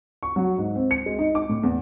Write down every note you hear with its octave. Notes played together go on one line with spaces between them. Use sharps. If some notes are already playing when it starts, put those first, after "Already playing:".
C#6
F#3
G#2
C4
C#7
G#3
D#4
D6
A2
E2